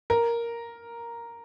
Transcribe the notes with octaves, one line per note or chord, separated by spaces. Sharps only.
A#4